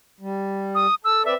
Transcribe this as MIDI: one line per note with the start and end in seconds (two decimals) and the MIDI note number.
0.21 0.86 55
0.75 0.95 87
1.04 1.25 69
1.04 1.25 88
1.25 1.34 60
1.25 1.34 71
1.25 1.34 74
1.25 1.37 76